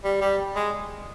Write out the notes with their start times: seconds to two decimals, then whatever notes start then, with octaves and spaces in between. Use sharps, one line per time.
0.04 G3
0.21 G3
0.56 G#3